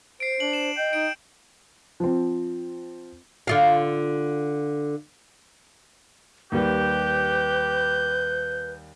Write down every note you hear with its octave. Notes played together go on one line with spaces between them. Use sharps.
C5 C7 D7
D4 F#7
E7
D#5 G5
D#4 D7
F3 C4
D3 F4 F5
D#2 G3 G4 B4 G6